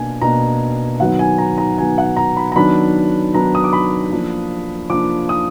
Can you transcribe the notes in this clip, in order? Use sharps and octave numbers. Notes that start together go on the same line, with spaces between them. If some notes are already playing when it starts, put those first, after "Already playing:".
Already playing: B2 A#3 D4 G#5
B2 A#3 D4 A#5
D#3 F#3 B3 F#5
G#5
A#5
A#5
D#3 F#3 B3 G#5
F#5
A#5
B5
A#5
D#3 F#3 B3 D4 B5
D#3 F#3 B3 D4 A#5
D#6
D6
B5
F3 A#3 D4
F3 A#3 D4 D6
D#6